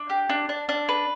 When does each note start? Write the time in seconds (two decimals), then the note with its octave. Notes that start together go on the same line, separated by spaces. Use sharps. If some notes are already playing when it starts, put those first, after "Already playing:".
Already playing: D4
0.10 G4
0.29 D4
0.49 D4
0.69 D4
0.89 B4